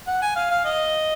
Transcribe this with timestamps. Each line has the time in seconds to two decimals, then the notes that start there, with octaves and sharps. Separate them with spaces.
0.07 F#5
0.22 G#5
0.36 F5
0.50 F5
0.65 D#5